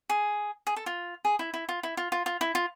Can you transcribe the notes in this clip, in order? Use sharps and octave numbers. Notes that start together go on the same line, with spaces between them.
G#4
G#4
A4
F4
G#4
E4
E4
F4
E4
F4
F4
F4
E4
F4